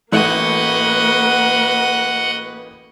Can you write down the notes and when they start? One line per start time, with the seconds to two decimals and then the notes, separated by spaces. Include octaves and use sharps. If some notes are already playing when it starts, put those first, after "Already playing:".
0.12 A1 A3 A#3 F#4 B4 D#5 F#5